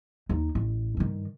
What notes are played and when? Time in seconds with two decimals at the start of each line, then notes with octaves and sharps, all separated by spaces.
0.29 D#2 D#4
0.55 A1
0.97 G2 D#3